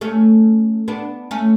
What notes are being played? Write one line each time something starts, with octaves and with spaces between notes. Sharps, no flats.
A3 C#4
B3 D4
A3 C#4